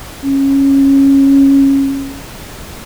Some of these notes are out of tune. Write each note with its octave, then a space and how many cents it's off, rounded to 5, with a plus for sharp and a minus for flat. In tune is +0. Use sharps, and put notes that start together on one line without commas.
C#4 -15